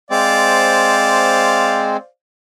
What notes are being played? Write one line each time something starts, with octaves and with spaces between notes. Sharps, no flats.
G#3 C4 C5 D5 F5